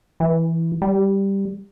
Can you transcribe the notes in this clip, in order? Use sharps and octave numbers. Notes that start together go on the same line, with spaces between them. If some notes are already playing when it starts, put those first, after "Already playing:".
E3
G3